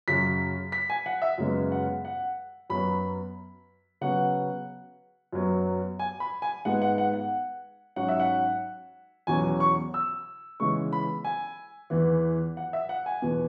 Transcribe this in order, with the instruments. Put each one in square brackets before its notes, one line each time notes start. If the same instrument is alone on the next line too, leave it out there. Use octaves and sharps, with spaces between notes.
[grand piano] F#2 C#3 F#3 B6
B6
G#5
F#5
E5
F#2 C#3 G#3 B3
F#5
F#5
F#2 F#3 B3 B5
C#3 F#3 B3 F#5
F#2 F#3 B3
G#5
B5
G#5
G#2 G#3 B3 F#5
F#5
F#5
F#5
G#2 F#3 C#4 F#5
E5
F#5
E2 B2 F#3 C#4 G#5
C#6
E6
C#3 E3 G#3 B3 C#6
B5
G#5
E2 E3 B3
F#5
E5
F#5
G#5
E2 B2 B3